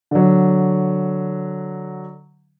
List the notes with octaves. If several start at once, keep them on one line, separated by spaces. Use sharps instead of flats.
D3 F#3